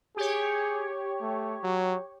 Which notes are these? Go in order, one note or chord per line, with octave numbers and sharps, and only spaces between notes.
G4 G#4 C#5
A3
F#3